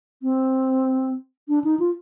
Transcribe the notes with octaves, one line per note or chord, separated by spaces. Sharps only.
C4
D4
D#4
F4